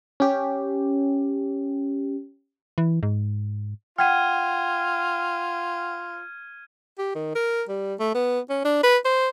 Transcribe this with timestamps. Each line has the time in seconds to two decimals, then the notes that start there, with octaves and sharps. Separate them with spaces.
0.20 C#4 G4
2.78 E3
3.03 G#2
3.98 F4 F#5 G5 F6 G#6 D#7
6.98 G4
7.15 D#3
7.35 A#4
7.68 G3
7.99 A3
8.14 B3
8.49 C#4
8.65 D4
8.83 B4
9.05 C5